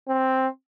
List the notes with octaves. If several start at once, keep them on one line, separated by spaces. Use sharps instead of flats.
C4